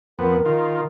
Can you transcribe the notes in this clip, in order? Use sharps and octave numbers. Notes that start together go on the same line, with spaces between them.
F2 B3 A#4
D#3 F4